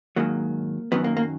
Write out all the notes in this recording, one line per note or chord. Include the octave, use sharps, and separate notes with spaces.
G#2 D#3 F#3 A#3
F#2 D#3 F#3 B3
A#3
A#3